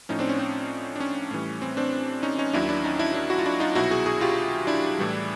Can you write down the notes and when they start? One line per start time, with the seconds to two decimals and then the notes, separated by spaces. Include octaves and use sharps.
0.09 A2 F3 C#4 D#4
0.19 C4 D4
0.29 C#4
0.39 C4
0.96 D4
1.00 C#4
1.31 A2 E3 G3
1.62 C4
1.77 C4 D4
2.23 C#4 D#4
2.38 C#4 D#4
2.53 D#2 D#3 F#3 D4 E4
2.69 D4 E4
2.84 C#4 D#4
2.99 D4 E4
3.14 D4 E4
3.30 E4 F#4
3.38 F4
3.46 D4 E4
3.60 D#4 F4
3.75 C2 B2 F#3 E4 F#4
3.91 F#4 G#4
4.06 F#4 G#4
4.21 F4 G4
4.67 D4 E4
4.98 A2 E3 G3